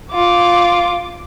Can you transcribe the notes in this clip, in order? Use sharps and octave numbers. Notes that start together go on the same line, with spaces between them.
F4 D6